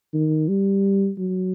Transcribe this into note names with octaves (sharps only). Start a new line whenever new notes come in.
D#3
G3
F#3